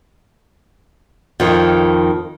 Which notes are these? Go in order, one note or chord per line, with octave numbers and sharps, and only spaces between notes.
F2 D#3